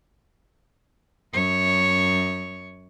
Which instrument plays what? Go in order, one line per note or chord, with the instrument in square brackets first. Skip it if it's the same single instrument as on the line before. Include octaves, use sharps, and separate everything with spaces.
[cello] F#2 C#5